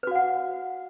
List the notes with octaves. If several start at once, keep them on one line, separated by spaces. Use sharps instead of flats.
F#4 B4 F5 F#5